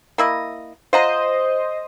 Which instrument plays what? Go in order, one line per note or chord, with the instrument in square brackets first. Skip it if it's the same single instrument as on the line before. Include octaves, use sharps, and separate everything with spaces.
[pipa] A#3 E4 D#5
[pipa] F4 F#5 A#5 [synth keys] C5 D#5